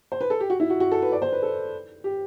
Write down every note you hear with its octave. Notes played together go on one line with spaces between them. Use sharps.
C5
B4
A4
G4
F#4
E4
F#4
F#4
A4
B4
D5
C5
B4
A4
G4